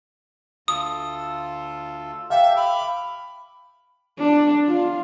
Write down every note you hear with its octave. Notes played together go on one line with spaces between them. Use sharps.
D2 F4 A4 D#6
G4 A4 E5 F5 G5
B5 D6 F6
D4
F4